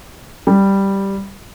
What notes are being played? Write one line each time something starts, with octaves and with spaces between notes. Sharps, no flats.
G3